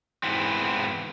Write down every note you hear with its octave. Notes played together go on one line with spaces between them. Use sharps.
G#2 E3 B3 C4